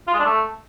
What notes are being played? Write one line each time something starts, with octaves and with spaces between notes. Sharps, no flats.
F4
G#3
D4
A3